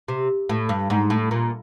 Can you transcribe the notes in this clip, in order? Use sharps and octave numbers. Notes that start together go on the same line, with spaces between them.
C3
A2
G2
G#2
A2
A#2